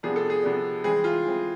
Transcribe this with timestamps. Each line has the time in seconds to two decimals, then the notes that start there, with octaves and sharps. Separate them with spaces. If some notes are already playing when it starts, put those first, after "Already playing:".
0.03 C3 F3 B3 D4 G#4
0.16 A4
0.30 G#4
0.43 C3 F3 B3 D4
0.84 E3 G#3 C4 G#4
1.04 F4
1.24 E3 G#3 C4